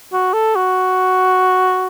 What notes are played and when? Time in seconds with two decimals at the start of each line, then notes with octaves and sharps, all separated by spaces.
0.13 F#4
0.33 A4
0.56 F#4